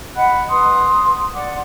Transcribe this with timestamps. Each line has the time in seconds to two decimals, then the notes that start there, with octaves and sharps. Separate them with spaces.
0.16 D#5 F#5 B5 F#6
0.49 B4 C6 D#6
1.34 D5 F#5 D6